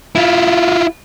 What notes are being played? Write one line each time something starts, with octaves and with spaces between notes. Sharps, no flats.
E4 F4